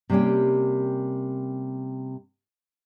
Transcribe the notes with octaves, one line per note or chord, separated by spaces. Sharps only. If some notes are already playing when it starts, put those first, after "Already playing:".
C3 G3 A#3 C#4 G4